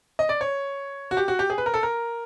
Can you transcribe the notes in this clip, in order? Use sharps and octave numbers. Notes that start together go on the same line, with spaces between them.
D#5
D5
C#5
F#4
G4
F#4
G4
G#4
B4
A#4
A4
A#4